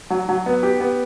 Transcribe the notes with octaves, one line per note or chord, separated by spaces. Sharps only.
F#3
F#3
B3
G4
B3